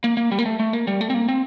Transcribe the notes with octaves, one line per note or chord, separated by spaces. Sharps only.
A#3
A#3
G3
A#3
A3
A3
A#3
G3
A3
C4
A#3
C4